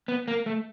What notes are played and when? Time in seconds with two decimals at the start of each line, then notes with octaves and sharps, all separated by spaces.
0.08 B3
0.28 A#3
0.46 A3